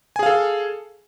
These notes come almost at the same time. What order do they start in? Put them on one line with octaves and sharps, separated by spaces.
G#5 G#4 F5 A4